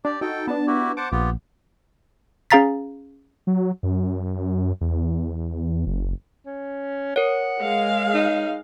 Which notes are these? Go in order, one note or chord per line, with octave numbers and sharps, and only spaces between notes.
D4 G4 D5
D#4 F#4 A4 G5
B3 D4 A5
E4 F#4 G4
C5 F#5 A5 D6
A#1 B3 F4 G4
C#4 G#4 F5 A#5 A6 B6
F#3
F#2
E2
F#1
C#4
A#4 C#5 F#5
G#3 F5
D#4